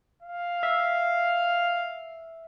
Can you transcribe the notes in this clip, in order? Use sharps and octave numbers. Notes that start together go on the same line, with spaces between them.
F5
E5